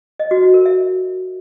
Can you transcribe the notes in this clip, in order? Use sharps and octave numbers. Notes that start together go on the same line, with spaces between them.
D#5
F#4
E4
A#4
E5